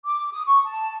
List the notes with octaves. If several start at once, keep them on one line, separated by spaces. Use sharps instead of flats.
D6
D#6
C#6
A5